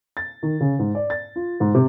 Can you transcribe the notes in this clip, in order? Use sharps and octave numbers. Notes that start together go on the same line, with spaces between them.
A6
D#3
C#3
G#2
D5
A6
F4
G#2
C3